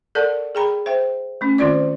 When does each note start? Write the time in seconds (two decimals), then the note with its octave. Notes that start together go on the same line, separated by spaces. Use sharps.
0.15 A4 A#4 D5 F#5 A5
0.55 G#4 G5 A#5 B5
0.86 C5 E5 G5
1.41 A3 C#4
1.58 D#3 C4 F4 C5 D5 D6